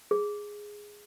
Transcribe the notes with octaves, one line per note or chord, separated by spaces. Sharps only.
G#4